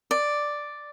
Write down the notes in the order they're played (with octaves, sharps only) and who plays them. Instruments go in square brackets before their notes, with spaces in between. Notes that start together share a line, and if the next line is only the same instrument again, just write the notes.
[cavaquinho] D5